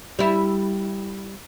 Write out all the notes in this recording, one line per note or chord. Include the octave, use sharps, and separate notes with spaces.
G3 E4